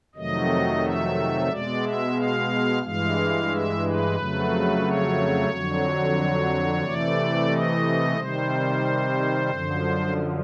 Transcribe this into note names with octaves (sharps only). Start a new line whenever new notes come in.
F2 C3 D#3 F#3 A3 D#5
E5
B2 G#3 D5
E5
F5
G2 E3 G#3 F5
E5
B4
F2 C#3 F#3 A3
C#5
F2 D3 F#3
C3 E3 A3 D5
D#5
C3 D#3 G3 C5
F#2 D3 F3